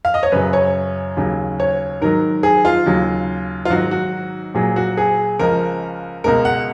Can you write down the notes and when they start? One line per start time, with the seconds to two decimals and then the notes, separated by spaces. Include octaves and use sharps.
0.05 F5
0.14 D#5
0.23 C#5
0.32 F#2 C#3 F#3 B4
0.53 C#5
1.17 D#2 C#3 F#3
1.60 C#5
2.01 G#2 D#3 F#3 A#4
2.43 G#4
2.65 F4
2.86 D#2 C#3 F#3
3.65 F4
3.70 G#2 D#3 F#3 F#4
3.91 F#4
4.54 A#2 F#3 G#4
4.76 F#4
4.97 G#4
5.39 C#2 C#3 F3 A#4
6.24 C#2 B2 G#3 A#4
6.45 F#5